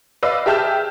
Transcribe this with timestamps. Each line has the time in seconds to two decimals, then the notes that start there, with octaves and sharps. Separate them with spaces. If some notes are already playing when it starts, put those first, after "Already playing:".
0.23 B4 D5 D#5 F5 E6
0.46 G4 G#4 E5 A5 F6 G6